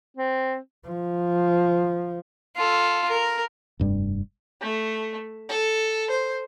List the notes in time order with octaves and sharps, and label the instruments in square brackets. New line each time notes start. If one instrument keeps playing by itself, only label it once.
[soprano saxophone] C4
[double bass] F3
[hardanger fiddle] F4 A4
A#4
[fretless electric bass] F1 G2 G3
[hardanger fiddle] A3
A4
C5